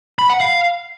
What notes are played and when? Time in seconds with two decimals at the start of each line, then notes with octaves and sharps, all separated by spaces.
0.19 B5
0.30 F#5
0.41 F5